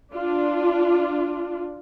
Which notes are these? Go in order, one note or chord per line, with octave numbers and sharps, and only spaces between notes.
D4 F4